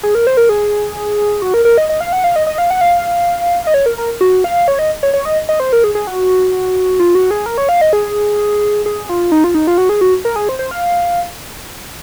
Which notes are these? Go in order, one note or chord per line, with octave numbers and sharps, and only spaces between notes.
G#4
A#4
C5
A#4
G#4
F#4
A#4
A#4
D#5
D#5
F5
F#5
F5
D#5
D#5
F5
F#5
F5
D#5
C#5
A#4
A#4
F#4
F5
C#5
D#5
C#5
C#5
D#5
D#5
C5
A#4
G#4
G#4
F#4
F4
F#4
G#4
A#4
C#5
F5
D#5
G#4
G#4
F4
D#4
F4
D#4
F4
F#4
G#4
F#4
A#4
G#4
C5
C5
F5